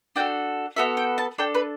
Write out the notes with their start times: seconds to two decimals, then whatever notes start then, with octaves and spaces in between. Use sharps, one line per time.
0.16 D4 F#4 A4 G5
0.77 B3 F#4 A4 E5
0.97 G5
1.18 A5
1.38 D4 A4 G5
1.55 B4